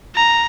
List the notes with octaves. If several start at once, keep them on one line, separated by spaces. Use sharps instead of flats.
A#5